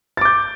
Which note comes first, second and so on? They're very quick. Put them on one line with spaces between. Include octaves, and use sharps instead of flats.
A6 D6 G6